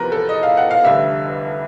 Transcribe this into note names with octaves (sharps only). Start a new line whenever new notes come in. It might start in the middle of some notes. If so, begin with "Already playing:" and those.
Already playing: E2 C3 F3 A#4 B4
A4
D#5
F5
F#5
F5
F1 F2 D3 G3 E5